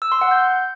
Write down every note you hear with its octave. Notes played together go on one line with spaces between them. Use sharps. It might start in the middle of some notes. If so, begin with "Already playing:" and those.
E6
C6
F#5
G6